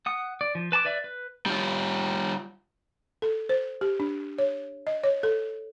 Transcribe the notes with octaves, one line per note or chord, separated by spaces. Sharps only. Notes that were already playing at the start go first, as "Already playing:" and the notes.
F#5 D#6
D5
F3
B4 A5 B5 D6
B4 D5 E5
B4
G3 F4
A4
C5
G4
D4
C#5
D#5
C#5
A4